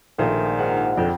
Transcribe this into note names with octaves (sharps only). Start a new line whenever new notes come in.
A#1 D#3 A3 G#4 C5
G#2 F#5 F6
F2 D3 G5